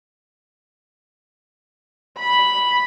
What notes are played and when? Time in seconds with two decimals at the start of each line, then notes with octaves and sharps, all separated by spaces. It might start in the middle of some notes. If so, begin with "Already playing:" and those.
2.18 B5